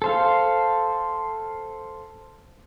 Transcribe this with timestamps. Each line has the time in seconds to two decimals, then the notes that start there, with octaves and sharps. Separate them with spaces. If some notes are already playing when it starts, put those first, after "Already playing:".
0.02 A4 C5 F5